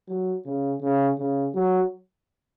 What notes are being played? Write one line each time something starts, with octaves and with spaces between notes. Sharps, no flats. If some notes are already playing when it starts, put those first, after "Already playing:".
F#3
C#3
C#3
C#3
F#3